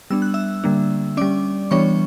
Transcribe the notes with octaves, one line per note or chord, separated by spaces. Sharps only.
G3 B3 D4 E6
F#6
E5 E6
D3 G3 A#3 D4
G3 C#4 D5 D6
E3 G3 B3 D4 C#5 C#6